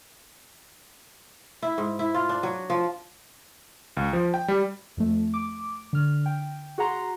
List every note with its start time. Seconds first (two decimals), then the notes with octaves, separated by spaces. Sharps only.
1.62 E4
1.78 G#2
1.99 E4
2.14 F4
2.29 D4
2.43 F#3
2.70 F3
3.97 C#2
4.13 F3
4.34 G5
4.48 G3
4.97 F2 A3
5.34 D6
5.93 D3 F6
6.26 G5
6.78 F#4 G#4 F#5 A#5 C6